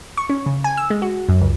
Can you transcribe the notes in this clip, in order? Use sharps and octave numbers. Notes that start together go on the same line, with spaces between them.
C#6
C#4
C#3
G#5
E6
G#3
F#4
F#2
C#2